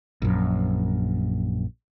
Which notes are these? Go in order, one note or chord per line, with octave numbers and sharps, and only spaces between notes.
A#1 F#2